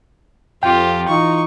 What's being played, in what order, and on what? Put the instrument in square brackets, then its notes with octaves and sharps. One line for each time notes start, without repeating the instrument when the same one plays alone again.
[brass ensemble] F2 [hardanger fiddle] F4 G4 [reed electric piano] G5
[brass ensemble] E3 D#4 F4 [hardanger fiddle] C#6